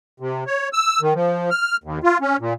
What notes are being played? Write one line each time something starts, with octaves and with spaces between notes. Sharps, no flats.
C3
C#5
E6
D#3
F3
F6
D#2
F4
C#4
A#2